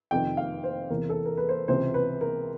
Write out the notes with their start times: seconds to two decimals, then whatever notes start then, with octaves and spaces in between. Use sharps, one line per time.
0.11 F2 C3 D#3 G5
0.37 F5
0.64 C5
0.90 E2 C3 E3 A#4
1.09 A4
1.25 A#4
1.37 B4
1.49 C5
1.68 C#2 C3 E3 C5
1.94 B4
2.21 A#4